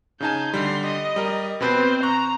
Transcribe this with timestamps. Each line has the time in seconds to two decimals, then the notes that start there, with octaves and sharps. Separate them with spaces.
0.20 C#3 D#4 G#5 A5 G6
0.54 D3 G3 C6
0.84 D#5
1.16 G3 A#4
1.61 B2 C4 B4 C5
2.03 A#5 C#6 F#6